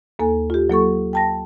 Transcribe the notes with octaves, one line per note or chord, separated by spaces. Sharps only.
D#2 A#3 A4 G#5
F4 G4
F#3 A#3 A4 C#6
G5 A5 A#6